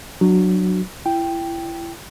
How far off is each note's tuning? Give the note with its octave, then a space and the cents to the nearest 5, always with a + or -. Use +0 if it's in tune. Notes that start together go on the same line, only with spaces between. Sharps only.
F#3 +0 D4 +15 F#4 -10
E4 +30 G5 +0